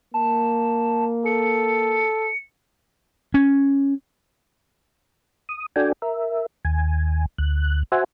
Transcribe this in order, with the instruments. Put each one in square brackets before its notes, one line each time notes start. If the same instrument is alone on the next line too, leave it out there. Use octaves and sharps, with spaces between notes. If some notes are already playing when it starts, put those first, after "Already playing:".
[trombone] A#3 [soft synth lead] A5
[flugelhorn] A4 [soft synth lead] C#7
[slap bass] C#4
[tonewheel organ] D#6
D4 F#4 A4 D5 G5 G#5
A#4 E5
D#2 G#5
D2 F#6
F#4 C5 E5 F#5 G#5